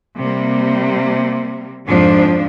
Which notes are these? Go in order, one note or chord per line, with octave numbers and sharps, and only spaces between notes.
C3 G3 A#3
F2 G#2 F3 D4